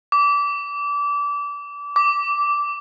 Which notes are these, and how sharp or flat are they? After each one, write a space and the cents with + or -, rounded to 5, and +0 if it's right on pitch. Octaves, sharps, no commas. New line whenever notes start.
D6 -25
D6 -10